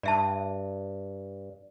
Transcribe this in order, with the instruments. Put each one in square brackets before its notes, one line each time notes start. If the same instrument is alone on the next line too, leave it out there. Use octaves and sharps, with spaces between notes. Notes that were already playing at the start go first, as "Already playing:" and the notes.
[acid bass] G2 [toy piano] D5 E5 A5